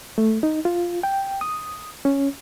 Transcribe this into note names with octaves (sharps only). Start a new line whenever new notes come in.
A3
D#4
F4
G5
D#6
C#4